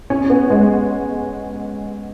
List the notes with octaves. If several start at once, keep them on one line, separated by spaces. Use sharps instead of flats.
C#4
B3
G#3